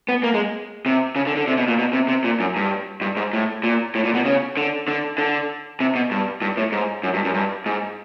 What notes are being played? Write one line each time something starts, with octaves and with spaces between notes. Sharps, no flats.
B3
A#3
G#3
C3
C#3
D3
D3
C3
B2
A#2
B2
C3
C3
A#2
F#2
G2
G2
G#2
A2
A#2
A2
A#2
B2
C#3
D3
D3
D3
C3
B2
G2
G2
A2
G#2
F#2
G2
F#2
G2
G#2